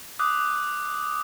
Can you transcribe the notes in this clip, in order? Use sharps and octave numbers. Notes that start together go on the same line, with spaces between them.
D6 D#6 F#6